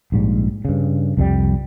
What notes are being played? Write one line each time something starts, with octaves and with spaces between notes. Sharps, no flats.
A#1 G#2 G3
G2 C#3
C2 F2 F#3 G3